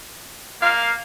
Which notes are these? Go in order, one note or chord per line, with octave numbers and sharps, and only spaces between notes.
A#3 F5